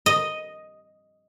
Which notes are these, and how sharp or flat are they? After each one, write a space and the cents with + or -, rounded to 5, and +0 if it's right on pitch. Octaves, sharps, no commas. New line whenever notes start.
D#5 +0